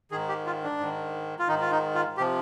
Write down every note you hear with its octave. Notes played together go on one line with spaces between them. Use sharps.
G#2 D#3 G#4
G4
F4
D4
G#2 D#3
F4
G#2 D#3 D#4
F4
D#4
F4
C3 F3 G4